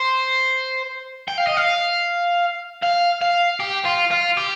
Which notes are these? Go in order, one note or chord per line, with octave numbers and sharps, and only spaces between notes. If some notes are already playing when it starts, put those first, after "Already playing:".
Already playing: C5
G5
F5
D#5
F5
F5
F5
G4
F4
F4
G4